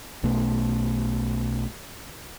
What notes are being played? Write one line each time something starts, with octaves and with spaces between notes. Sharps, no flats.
B1 B2 A3